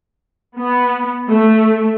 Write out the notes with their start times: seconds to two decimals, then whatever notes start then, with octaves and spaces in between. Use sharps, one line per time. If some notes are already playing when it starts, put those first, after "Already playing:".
0.57 B3
1.28 A3